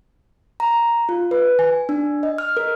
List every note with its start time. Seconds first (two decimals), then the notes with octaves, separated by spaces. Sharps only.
0.60 A#5
1.09 F4
1.31 B4
1.59 G#5
1.89 D4
2.23 D#5
2.38 F6
2.57 A#4